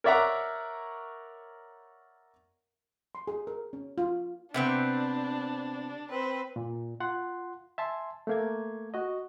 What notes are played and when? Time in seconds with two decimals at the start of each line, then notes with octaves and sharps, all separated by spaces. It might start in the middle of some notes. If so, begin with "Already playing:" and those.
0.04 A#4 C#5 D5 E5 F#5 A#5
3.15 C6
3.27 G#4
3.47 A#4
3.73 C#4
3.98 F4
4.54 C3 B3 C4 D4
6.09 C4 B4
6.56 A#2
7.00 F4 F#5 C6
7.78 E5 G#5 A5 C6
8.27 A3 A#3 G#6
8.94 F#4 D#5